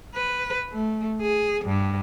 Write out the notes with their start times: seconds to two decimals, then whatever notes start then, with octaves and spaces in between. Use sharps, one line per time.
0.15 B4
0.73 A3
1.21 G#4
1.65 G2